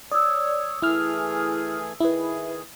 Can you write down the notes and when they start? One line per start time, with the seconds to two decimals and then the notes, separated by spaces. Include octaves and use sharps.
0.12 C#5 D5 D#6 E6
0.82 E3 A3 E4 G#4 F6
2.00 D#3 E4 G#4 B4